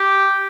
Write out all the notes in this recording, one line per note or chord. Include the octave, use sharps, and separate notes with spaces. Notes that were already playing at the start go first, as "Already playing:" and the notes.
Already playing: G4